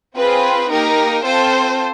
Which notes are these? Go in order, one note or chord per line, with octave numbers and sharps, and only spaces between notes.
C4 F4 G#4 B4
A#3 D#4 G4 A#4
C4 F4 A4 C5